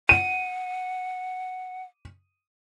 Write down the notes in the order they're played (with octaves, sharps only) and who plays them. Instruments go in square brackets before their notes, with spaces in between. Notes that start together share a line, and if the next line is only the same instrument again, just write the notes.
[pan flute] F#5 [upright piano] D#7